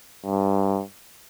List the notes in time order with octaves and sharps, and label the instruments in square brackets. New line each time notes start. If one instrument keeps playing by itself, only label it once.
[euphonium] G2